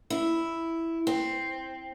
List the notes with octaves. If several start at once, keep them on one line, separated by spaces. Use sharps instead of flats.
E4
C4